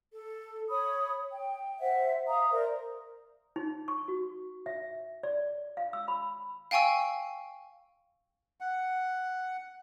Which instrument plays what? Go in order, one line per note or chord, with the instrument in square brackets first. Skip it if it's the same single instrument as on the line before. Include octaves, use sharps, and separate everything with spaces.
[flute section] A4
C#5 B5 D#6
G5
C5 E5 F#5
E5 F5 A#5 D#6
A#4 C5 D5
[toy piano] D#4
C#6
F#4
E5
D5
F5
E6
B5
[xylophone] F5 G5 G#5 C#6 E6
[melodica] F#5